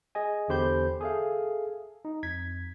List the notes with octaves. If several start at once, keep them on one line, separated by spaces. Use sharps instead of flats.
G#4 D#5 G#5
E2 D3 G4 C5 B5 G6
G#4 A4 E5 F5
D#4
F2 G#6 B6